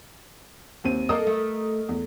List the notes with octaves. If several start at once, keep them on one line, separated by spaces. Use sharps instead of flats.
D#2 C4 D#7
A#3 D#4 A4 A#4 D#5 D#6
A3
E2